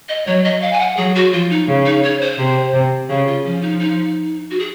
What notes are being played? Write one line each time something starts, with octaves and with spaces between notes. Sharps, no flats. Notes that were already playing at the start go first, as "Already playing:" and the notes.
D#5
F#3 C#5
D#5
F5
G#5
F#5
F#3 G#4
F#4
F3 F4
D#4
C#3
D#4
C#5
C5
C3
C3
C#3 G#4
F4
F3 C#4
D#4
D#4
F#4
G#4